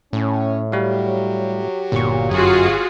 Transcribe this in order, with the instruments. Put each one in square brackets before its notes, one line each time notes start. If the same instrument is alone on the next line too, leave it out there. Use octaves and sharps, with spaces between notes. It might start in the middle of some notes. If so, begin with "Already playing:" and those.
[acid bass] A2 [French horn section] C#4
[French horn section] F#3 G4 [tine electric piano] G3 F5
[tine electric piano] G1 C#6 [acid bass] A#2
[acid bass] F#2 [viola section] F4 F#4 G#4